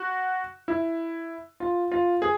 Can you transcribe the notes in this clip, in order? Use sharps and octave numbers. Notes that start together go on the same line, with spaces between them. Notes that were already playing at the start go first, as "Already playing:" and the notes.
Already playing: F#4
E4
F4
F4
G#4